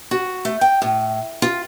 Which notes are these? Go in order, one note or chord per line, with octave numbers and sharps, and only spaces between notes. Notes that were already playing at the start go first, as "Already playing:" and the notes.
F#4
A3
G5
A2
F4